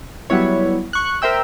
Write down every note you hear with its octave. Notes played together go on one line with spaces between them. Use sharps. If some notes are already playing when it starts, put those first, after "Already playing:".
F#3 G3 B3 E4 C#5
C#6 F#6
A#4 C5 E5 G5 E6